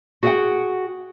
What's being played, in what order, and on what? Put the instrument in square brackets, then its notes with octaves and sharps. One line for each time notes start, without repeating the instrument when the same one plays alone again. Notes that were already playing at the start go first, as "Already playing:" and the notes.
[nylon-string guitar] F#4 G#4 C#5 D#5 F#5 G5